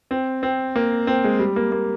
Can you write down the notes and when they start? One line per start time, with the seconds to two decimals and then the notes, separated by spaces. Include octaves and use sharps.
0.11 C4
0.43 C4
0.76 A#3
1.07 C4
1.24 G#3
1.39 G3
1.56 A#3
1.72 A#3